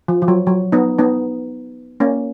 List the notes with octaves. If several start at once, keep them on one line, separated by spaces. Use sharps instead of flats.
F3
F3
F#3
F#3
B3 D#4
B3 D#4
A#3 C#4